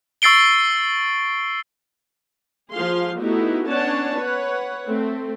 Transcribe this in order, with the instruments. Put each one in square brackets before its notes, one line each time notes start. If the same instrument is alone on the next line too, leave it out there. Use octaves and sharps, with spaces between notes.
[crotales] C#6 E6 A6 C7 D7 G7
[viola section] F3 F4 G#4 F5 C6
A3 B3 D#4 E4 F#4 G4
B3 C#4 D4 C#5 F#5 A5
B4 C#5 F#5
A3 C4